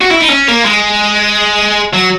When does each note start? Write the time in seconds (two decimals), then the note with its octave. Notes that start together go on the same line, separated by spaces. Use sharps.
0.01 F#4
0.11 E4
0.20 D#4
0.30 C#4
0.48 A#3
0.65 G#3
1.93 F#3